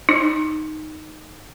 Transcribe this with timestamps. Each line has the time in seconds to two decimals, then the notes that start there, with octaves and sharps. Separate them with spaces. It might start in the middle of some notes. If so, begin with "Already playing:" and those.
0.09 D#4